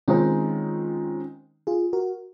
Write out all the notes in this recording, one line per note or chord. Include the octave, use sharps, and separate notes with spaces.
D#3 G#3 C4 C#4 D#4 F4
F4 G#4
F#4 A#4